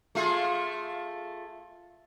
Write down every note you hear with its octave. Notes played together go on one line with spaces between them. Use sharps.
A3 F4 G#4